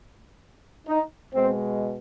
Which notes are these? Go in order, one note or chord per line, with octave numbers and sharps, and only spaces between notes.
D#4
B2 G#3 C4